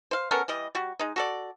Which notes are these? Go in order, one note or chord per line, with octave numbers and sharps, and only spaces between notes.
C5 F5
B3 C#4 A4 A#4
E3 G3 D#5
G3 F#4
G#3 D#4
F#4 A4 D5